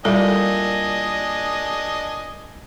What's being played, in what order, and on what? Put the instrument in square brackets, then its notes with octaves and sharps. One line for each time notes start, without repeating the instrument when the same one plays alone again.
[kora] A#2 E4 G4 [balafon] G3 A4 [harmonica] D4 D#5 G#5